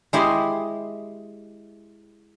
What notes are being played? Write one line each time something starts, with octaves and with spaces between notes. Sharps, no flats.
G#3 E4 G4 C5 D#5 C6